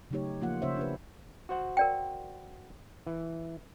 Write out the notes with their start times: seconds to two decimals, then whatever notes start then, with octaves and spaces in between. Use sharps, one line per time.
0.11 C#3 F#3 A3 D#4 G4 C#5
0.41 F3 A#3 F4 F#5
0.62 C#3 A#3 C#4 C5 C#5 E5
0.77 D4 G4 B4
1.49 F#4 C5 F#5
1.77 A#4 D5 G5
3.07 E3